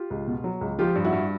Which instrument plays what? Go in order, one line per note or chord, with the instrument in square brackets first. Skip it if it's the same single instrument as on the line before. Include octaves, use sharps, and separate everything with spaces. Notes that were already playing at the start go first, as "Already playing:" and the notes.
Already playing: [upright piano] F4 G4
C#2
B2
F#3
C#2
F3 F4 G4
G2
E4 F#4
G2